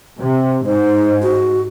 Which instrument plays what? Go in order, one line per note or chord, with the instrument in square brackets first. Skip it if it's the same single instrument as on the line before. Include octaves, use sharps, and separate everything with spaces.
[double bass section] C3
[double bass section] G#2 [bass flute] D#4 [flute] C5
[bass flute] F#4